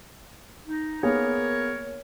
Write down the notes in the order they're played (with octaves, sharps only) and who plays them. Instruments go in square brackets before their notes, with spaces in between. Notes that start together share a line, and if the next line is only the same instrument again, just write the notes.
[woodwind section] D#4
[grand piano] A#3 B3 G#4 [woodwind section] A#4 C#5